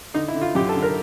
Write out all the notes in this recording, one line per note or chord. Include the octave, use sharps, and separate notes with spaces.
D3 D#4
E4
D3
F4
F#2 G4
A4
D3
A#4